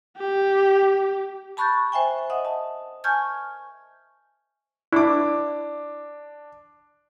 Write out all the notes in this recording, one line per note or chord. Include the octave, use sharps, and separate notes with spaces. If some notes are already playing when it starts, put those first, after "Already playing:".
G4
A5 B5 C#6 F#6 G6 A6
C5 E5 G5 G#5
D#5 E5 F#5 D#6
E5 A5
G#5 A5 C#6 F6 G6 G#6
D4 E4 D6